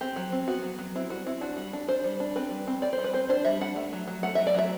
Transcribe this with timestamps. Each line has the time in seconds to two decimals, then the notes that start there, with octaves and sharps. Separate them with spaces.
0.01 C4 G4
0.16 F#3
0.32 C4
0.47 B3 F#4
0.63 F#3
0.78 F#3
0.95 C4 E4
1.10 G3 F#4
1.26 C4 E4
1.41 D4 F#4
1.57 G3
1.73 D4
1.89 D4 C5
2.04 G3
2.20 D4
2.36 C4 B4
2.51 G3
2.67 C4
2.82 C4 D5
2.93 C5
2.99 G3
3.04 B4
3.13 C4 C5
3.29 D4 C5
3.45 G3 E5
3.61 D4 F#5
3.76 A3
3.93 F#3
4.08 F#3
4.23 A3 F#5
4.35 F#3 E5
4.47 D5
4.54 F#3 E5